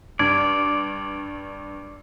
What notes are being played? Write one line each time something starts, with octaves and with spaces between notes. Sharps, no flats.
G2 D5 G#6